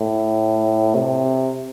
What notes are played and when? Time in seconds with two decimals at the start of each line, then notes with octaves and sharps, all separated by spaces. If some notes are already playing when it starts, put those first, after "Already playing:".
Already playing: A2
0.95 C3